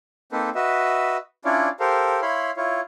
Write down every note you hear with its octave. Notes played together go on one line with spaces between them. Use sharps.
A#3 C4 D#4 A4 B4 C5
F#4 B4 D#5 E5
C#4 D4 E4 F4 C#5 D5
G4 A4 A#4 C5 F5
E4 C#5 F5 B5 C6
E4 F4 C#5